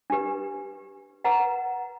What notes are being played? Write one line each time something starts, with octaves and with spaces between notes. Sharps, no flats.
D4 G4 B4
B4 D#5 F#5 A#5